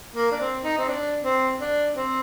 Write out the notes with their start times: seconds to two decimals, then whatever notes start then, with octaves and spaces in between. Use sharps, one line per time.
0.16 A#3
0.32 D4
0.40 C4
0.64 D#4
0.78 C4
0.88 D4
1.24 C4
1.60 D4
1.96 C4